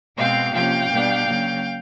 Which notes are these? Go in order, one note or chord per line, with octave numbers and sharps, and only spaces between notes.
B2 G#3 C4 F5 G5
C3 F3 A#3 C#4 F5 G5
B2 G3 B3 D4
C#3 F#3 A#3